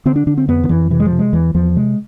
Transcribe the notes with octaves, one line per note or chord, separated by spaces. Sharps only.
D3 C4
D4
D3 D4
C4
F2 B3
D3
F2 E3
C3 E3
G#3
F3
C3
G#3
E2 E3
E2 F3
C3 G#3